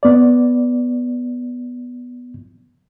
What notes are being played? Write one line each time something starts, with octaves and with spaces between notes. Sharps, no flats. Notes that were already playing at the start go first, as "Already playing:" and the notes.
B3 D5